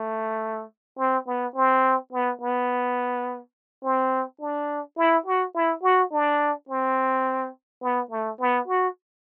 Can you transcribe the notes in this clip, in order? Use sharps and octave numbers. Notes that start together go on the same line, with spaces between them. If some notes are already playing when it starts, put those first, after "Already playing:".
Already playing: A3
C4
B3
C4
B3
B3
C4
D4
E4
F#4
E4
F#4
D4
C4
B3
A3
B3
F#4